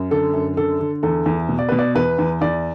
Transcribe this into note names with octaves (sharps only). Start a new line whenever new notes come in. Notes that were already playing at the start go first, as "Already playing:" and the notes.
Already playing: F#2
D3 A4
F#2
D3 A4
D3
E2 A4
E2
B2
D5
B2 B4
D5
E2 B4
E2
E2 D5